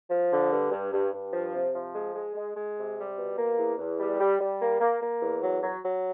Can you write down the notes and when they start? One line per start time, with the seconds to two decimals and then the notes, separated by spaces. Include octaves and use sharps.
0.10 F3
0.31 D3
0.51 G2
0.71 G2
0.92 G2
1.13 G2
1.33 F3
1.53 C3
1.73 F3
1.95 G#3
2.14 G#3
2.35 G#3
2.55 G#3
2.76 C3
2.97 G3
3.17 B2
3.37 A#3
3.57 E2
3.78 E2
3.99 G3
4.19 G3
4.40 G3
4.61 A#3
4.80 A#3
5.01 A#3
5.22 E2
5.42 F#3
5.62 F#3
5.83 F#3